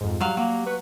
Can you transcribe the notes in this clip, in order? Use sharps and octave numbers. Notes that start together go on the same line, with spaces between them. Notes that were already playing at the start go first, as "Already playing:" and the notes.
F2 G#2
F#3 G3 F5
F#3 A#3
B4 C#6